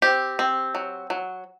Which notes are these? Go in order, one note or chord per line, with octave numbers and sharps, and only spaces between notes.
C4 G4
C4
F#3
F#3